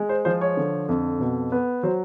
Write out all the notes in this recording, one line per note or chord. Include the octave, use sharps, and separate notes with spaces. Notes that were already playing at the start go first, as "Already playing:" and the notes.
Already playing: G#3
C5
F3 C5
C#5
D3
F2
B2
B3
F#3 C5